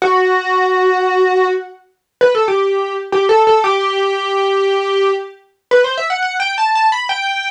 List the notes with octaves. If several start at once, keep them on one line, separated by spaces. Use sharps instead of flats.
F#4
B4
A4
G4
G4
A4
A4
G4
B4
C5
E5
F#5
F#5
G5
A5
A5
B5
G5